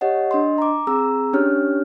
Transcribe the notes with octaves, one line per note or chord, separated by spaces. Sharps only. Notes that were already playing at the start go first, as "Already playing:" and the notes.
G4 C#5 D#5 F#5
D4 D#5 C6
A#5 D6
C4 G#4 A#5 E6
C#4 D4 G4 C#5 F6